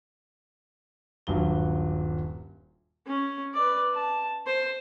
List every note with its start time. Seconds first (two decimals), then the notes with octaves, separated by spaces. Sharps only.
1.27 D#1 G2 F#3 G7
3.07 C#4
3.54 B4 D5
3.94 A5
4.46 C5